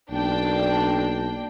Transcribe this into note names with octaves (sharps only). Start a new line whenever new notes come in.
B1 A#3 D4 G5